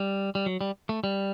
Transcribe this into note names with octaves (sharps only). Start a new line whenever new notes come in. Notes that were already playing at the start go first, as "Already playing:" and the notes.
Already playing: G3
G3
F#3
G3
A3
G3